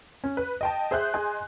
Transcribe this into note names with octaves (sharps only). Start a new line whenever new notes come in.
C#4
B4
D#5 G5 A5
G#4 C5 E5 F#6 G6
G#4 D#5 G#5 C6